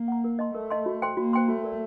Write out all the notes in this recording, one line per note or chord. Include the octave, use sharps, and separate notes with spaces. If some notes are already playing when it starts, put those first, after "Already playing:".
Already playing: A#3
F#5 A#5
A#4
D#5 A5 C6
A3 A#4
D#5 A5 C6
F#4
C5 G5 C6
A#3 F#4
C5 G5 C6
A3 F#4
A#4 D5